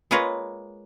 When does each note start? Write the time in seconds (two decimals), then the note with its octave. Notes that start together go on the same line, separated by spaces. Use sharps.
0.11 G#3 A#3 F4 B4 C#5 A#5